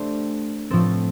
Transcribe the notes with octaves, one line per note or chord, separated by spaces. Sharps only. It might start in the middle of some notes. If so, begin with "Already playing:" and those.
Already playing: A3 D4 G4 C5
A2 F3 A3 C4 A4